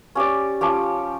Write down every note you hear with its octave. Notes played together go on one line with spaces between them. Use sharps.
C#4 G4 D5
F3 C#4 G4